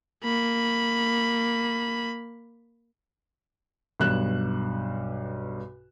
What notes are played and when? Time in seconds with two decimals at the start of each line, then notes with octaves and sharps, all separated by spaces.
0.24 A#3 B5
4.00 B1 G2 F#6 E7